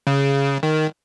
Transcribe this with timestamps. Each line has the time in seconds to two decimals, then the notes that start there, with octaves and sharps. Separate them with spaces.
0.07 C#3
0.63 D#3